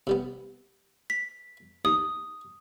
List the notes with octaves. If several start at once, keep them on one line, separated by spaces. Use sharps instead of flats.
C3 G3 B3
B6
D#2 D#6